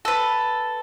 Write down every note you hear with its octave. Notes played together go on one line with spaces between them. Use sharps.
A4 B4